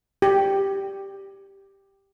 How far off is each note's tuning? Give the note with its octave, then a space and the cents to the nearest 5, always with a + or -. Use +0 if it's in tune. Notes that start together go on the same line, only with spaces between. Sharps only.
G4 +0